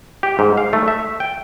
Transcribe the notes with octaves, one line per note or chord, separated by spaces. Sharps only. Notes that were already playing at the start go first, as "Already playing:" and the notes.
G4
G#2
F5
A3
E5
G5